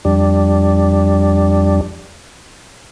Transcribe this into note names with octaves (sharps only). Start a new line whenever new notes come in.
F2 G3 D4